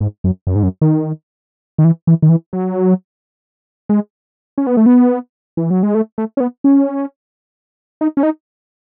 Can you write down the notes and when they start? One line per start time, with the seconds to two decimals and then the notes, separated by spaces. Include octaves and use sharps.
0.01 G#2
0.24 F#2
0.47 F#2
0.55 G#2
0.63 F#2
0.81 D#3
1.78 D#3
1.84 E3
2.07 E3
2.22 D#3
2.29 E3
2.53 F#3
3.89 G#3
4.58 C#4
4.67 B3
4.77 A3
4.86 B3
5.57 E3
5.70 F#3
5.83 G#3
5.95 A3
6.18 A3
6.37 C#4
6.40 B3
6.64 C#4
8.01 D#4
8.17 C#4
8.23 D#4